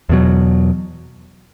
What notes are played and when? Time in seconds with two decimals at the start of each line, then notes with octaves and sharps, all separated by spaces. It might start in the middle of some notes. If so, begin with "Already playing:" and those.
0.09 E2 B2 F#3